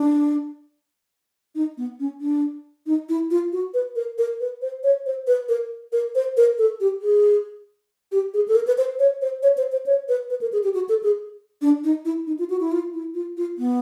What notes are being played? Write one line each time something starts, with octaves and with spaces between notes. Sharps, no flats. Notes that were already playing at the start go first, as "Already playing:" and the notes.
Already playing: D4
D#4
B3
C#4
D4
D#4
E4
F4
F#4
B4
A#4
A#4
B4
C5
C#5
C5
B4
A#4
A#4
C5
A#4
A4
G4
G#4
G4
G#4
A4
A#4
B4
C5
C#5
C5
C#5
C5
C5
C#5
B4
B4
A#4
G#4
G4
F#4
A4
G#4
D4
D#4
E4
D#4
F4
F#4
E4
F4
E4
F4
F4
B3